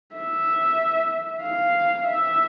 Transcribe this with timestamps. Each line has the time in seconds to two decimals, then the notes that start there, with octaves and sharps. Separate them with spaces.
0.15 E5
1.42 F5
2.06 E5